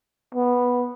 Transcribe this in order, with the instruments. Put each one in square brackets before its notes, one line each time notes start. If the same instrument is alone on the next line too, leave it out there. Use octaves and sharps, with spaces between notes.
[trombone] B3